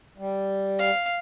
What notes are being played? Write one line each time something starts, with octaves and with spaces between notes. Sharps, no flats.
G3
F5